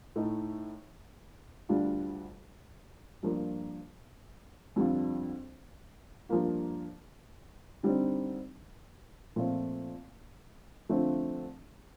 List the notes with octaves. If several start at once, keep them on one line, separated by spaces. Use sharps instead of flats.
A2 A3 D#4
D2 D3 G3 D4 F4
G2 F3 A#3 F4
F2 D3 G3 D4 F4
G2 F3 A#3 F4
D3 G3 C4 D#4
A#2 F3 A3 C4 F4
D3 F3 A3 C4 F4